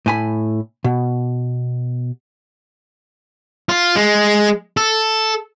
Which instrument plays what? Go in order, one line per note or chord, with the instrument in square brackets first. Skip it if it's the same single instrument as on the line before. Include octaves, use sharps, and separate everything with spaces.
[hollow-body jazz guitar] A2 G#5 B5
B2
[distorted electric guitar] F4
G#3
A4